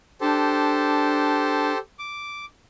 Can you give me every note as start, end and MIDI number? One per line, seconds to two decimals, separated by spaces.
0.21 1.72 62
0.21 1.78 67
0.21 1.78 69
0.21 1.78 72
1.99 2.45 86